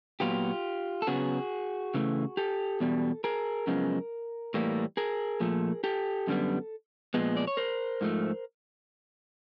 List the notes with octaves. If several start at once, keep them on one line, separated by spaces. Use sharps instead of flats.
A#2 F#3 B3 F4 G4
A4
C#3 F#3 B3 F#4 G#4
C#3 E3 A3
G4 A4
E2 B2 G3
G#4 A#4
F#2 C#3 F3 G#3 B3
A2 E3 G3 A#3
G#4 A#4
A#2 F3 A3
G4 A4
F#2 D3 G3 B3
A#2 F3 G#3 B3
D5
C#5
A#4 C5
G#2 F3 A3